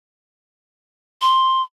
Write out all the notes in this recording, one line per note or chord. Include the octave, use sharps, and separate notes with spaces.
C6